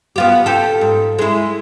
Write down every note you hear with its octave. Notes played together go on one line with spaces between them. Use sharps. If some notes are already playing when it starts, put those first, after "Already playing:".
B3 F4 G4
G4 A4
G#2
G#3 E4